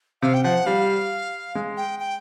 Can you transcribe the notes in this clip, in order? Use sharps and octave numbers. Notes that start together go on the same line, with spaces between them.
C3 F5
G5
F3 F#5
G3 F5
G#3
G5
G5